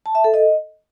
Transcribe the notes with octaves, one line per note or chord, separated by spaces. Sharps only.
A5
E5
A4
D#5